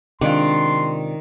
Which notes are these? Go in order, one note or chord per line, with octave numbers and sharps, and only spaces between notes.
C3 D#3 G#3 D4 F4 C6